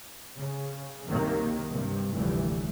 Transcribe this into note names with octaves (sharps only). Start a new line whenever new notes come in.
C#3
C2 F#2 C3 D#3 F#3 A#3
G2 C3
F1 D2 E3 G3 A3